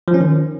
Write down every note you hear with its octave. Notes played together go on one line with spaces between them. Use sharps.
F3
C#4
D#3